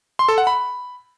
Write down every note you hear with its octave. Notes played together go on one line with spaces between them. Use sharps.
C6
A4
F#5
B5